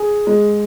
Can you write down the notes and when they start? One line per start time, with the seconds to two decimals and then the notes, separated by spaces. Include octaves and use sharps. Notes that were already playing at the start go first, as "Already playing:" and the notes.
Already playing: G#4
0.27 G#3